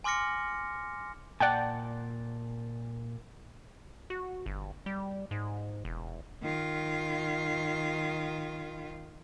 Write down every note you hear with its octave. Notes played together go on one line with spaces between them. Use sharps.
G#5 C6 D6 F6 A#6 C#7
A#2 D5 F#5 G5 A5
F#4
G1
G3
G#2
E1
D#3 F4